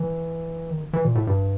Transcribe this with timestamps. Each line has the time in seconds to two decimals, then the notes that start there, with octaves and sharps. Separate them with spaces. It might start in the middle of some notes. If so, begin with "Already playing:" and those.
Already playing: E3
0.70 D#3
0.93 E3
1.05 A#2
1.15 A2
1.27 G2